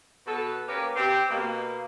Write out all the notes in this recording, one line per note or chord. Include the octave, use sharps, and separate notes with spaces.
B2 B3 F#4 A4
A#3 C#4 G4 A#4 B4
C4 G4
B2 A#3